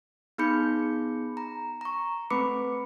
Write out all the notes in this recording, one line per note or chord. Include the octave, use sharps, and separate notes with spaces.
B3 D#4 G#4 B5 G6 C#7
A#5
A#5 C#6
A3 C4 B4 B5 D6 C#7